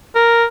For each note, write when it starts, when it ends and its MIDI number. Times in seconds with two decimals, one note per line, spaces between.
0.15 0.45 70